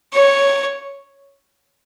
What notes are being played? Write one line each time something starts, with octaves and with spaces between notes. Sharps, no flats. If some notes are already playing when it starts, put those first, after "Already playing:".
C#5